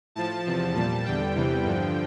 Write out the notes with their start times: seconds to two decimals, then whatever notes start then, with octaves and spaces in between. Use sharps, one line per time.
0.15 A2 F3 A5
0.46 E2 C3 F3
0.75 A#2 G3 A5
1.05 E2 D3 G3 G5
1.35 E2 C3 E3 G3
1.64 G2 D3 F3